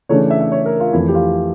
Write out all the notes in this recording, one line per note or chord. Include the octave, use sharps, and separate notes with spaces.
C#3 E3 A3 D4 C#5
E5
E5
C#5
A#4
F4
F2 E3 A3 E4
G4
F4